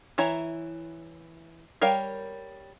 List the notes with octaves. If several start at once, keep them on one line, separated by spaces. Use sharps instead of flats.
E3 E4 C#5 A#5
G3 A#4 C#5 F5 G5